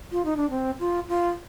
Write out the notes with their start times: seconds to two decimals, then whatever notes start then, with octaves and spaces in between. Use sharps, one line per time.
0.12 F4
0.25 D#4
0.37 D4
0.50 C4
0.80 F4
1.09 F4